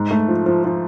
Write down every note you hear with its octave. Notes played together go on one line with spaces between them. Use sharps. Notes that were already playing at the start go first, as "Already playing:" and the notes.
Already playing: G#2
A3
F3
F3
F3